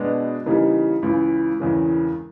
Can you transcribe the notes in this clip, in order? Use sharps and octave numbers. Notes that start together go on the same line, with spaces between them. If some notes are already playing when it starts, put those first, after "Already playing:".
Already playing: B2 G#3 B3 D4
C#3 E3 G3 A#3 D#4
C#2 C#3 E3
E1 E2 C#3 E3